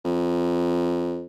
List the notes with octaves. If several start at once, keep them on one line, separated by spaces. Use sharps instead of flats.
F2